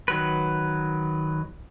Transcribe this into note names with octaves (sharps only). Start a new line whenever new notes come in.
D#3 F#3 B4